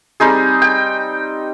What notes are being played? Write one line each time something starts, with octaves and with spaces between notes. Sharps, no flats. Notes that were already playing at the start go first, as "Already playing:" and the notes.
G3 C4 D#4 G#4
G5